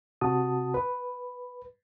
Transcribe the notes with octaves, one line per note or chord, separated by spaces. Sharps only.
C3 F#4 A5 D#6
B4